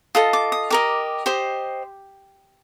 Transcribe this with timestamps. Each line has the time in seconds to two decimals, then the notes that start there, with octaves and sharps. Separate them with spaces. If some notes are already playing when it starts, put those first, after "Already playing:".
0.15 F4 A4 D#5 D#6
0.33 D6
0.52 D#6
0.70 G4 A#4 D#5 D6
1.26 G4 C5 D#5